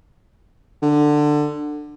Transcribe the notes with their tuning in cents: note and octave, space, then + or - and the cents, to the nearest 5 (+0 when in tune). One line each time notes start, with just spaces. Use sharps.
D3 +15